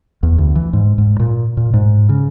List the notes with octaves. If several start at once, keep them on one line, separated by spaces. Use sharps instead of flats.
E2
D2
E3
G#2
G#2
A#2
A#2
G#2
C#3